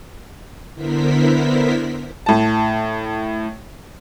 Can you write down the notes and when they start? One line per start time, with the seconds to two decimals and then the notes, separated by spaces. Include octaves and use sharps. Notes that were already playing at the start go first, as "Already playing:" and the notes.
0.74 D3 B3 E4 A#4 C5 B6
2.26 A2 A5